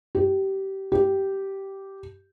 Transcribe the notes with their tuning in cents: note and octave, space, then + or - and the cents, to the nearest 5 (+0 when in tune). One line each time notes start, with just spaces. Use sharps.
G4 -20
G4 -10